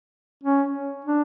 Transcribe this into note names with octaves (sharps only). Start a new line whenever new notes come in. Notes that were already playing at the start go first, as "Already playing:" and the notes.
C#4
D4